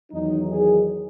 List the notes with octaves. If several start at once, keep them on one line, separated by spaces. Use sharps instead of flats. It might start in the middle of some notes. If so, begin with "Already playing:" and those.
E2 D#3 F#3 D#4
G#4